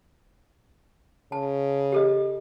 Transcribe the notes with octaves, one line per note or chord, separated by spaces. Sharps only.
C#3 A5
G4 A4 D#5